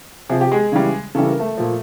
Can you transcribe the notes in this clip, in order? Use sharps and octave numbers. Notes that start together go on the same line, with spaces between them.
C3 F3 G#4
G4
G#3 G#4
C#3 E3 G3
C#3 E3 G3 A4
A#4
A3 A4
A#2 F3